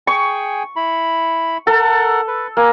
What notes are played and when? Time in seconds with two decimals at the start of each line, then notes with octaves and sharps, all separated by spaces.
0.07 G#4 G5 G#5 C#6
0.76 E4 B5
1.67 A4 A#4 F#5
2.27 B4
2.57 A#3 G#5